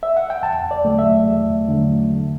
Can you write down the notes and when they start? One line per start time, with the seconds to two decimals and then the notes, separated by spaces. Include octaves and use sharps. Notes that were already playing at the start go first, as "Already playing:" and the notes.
0.03 E5
0.17 F#5
0.30 G5
0.43 E2 A5
0.71 D5
0.85 D3 F#3 A3
0.98 E5
1.26 E2
1.68 D3 F#3 A3
2.11 D3